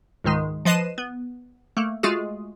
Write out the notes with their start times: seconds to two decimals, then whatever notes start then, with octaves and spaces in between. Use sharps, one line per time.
0.24 C#2 G#2 D#3 G#3
0.65 F3 B4 D#5 C7 D#7 E7
0.98 B3
1.77 A3 A#3
2.03 G#3 A3 F4 F#4 G#4